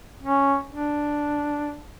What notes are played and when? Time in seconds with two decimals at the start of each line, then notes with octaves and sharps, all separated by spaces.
0.23 C#4
0.70 D4